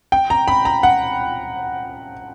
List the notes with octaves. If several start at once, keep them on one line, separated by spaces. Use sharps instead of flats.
G5
A#5
B5
A#5
F#5